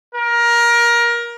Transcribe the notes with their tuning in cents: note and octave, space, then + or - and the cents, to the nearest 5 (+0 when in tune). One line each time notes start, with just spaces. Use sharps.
A#4 +20